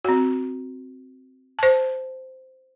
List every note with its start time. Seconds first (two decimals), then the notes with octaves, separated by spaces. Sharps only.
0.05 C4 F#4
1.59 C5 A5